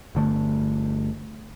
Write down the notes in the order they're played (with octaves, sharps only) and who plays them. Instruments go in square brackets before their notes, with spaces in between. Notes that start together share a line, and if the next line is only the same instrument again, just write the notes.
[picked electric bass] G1 D3 A3